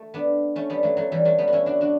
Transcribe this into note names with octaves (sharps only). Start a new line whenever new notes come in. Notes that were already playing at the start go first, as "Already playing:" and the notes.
Already playing: A3
B3 D4
A3 C#4
G3 B3
F#3 A3
F#3 A3
E3 G3
F#3 A3
G3 B3
F#4
C#4 E4
D4 F#4
D4 F#4